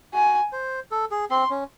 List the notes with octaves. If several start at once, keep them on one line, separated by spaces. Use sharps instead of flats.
F#4 G#5
C5
A4
G#4
C4 C6
C#4